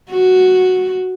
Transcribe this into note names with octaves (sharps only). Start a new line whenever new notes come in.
F#4